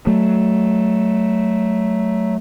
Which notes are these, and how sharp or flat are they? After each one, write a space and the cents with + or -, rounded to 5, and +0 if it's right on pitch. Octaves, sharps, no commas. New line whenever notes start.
F#3 +20 A3 +0